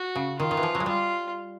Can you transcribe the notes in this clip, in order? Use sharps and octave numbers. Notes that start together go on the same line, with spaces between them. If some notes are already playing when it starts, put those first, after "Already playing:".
Already playing: F#4
C#3
D#3 F4
D#3
E3
F3
F#3
G#3
G3 F4